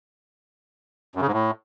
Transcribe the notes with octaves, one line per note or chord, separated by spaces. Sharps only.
F#2
C#3
G#2
A2